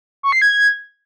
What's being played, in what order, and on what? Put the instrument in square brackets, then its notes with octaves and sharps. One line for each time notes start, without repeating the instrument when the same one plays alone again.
[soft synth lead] C#6
C7
G#6